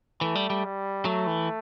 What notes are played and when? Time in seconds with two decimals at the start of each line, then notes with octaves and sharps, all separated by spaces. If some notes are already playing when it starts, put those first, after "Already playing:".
0.21 E3 A3
0.35 G3
0.50 G3
0.64 G3
1.05 F#3 A3
1.27 E3